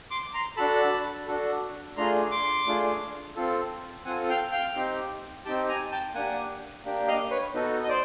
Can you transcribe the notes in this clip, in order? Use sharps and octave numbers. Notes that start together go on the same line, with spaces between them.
C6 D6
A#5 C6
D4 F#4 A4 A5 B5
D4 F#4 A4
A3 D4 F4 G#4 A#5 C6
C6 D6
A3 D4 F4 G#4
C4 F4 A4
C4 F4 A4 F#5 G#5
F5 G5
F5 G5
C4 D#4 G4
C4 D#4 G4 G5 A5
G#5 A#5
G5 A5
A#3 D4 G4 F#5 G#5
A#3 D4 G4
D#5 F5
B4 C#5
B3 D#4 F#4 A4
D#5
C5 D5